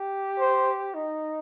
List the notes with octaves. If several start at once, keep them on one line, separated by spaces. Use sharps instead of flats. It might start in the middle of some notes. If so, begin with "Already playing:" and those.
Already playing: G4
C5
D#4